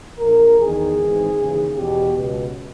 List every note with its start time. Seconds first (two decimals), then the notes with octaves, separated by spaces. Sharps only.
0.20 A#1 A#2 A#4
0.60 E2 D#3 G#4
0.98 G#1 G#2 E3
1.37 D#2 C#3 E3
1.77 E2 B2 G4
2.16 C#2 B2